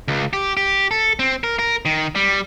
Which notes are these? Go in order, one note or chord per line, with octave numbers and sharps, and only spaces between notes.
C#2
G4
G4
A4
C4
A#4
A#4
D#3
G3